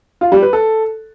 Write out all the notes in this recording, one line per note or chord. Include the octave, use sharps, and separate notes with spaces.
F4
G3
B4
A4